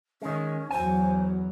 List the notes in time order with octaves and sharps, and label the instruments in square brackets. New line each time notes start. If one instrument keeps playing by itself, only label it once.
[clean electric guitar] D#3 G#3 [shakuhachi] C#4
[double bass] E2 F#3 [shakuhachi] C5 [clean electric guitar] G#5